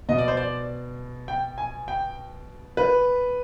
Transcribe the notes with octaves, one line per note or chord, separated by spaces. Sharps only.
B2 D#5
D5
C5
D5
G5
G#5
G5
B4